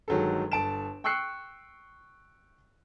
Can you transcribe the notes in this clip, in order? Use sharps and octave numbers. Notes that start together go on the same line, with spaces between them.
G1 D#3 F#3 G#3 A4
G1 A5 D7 E7
G5 C#6 E6 F#6 C7 C#7